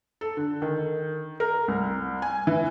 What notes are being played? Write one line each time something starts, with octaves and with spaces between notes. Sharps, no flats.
A4
D3
D#3
A#4
C2
G#5
E3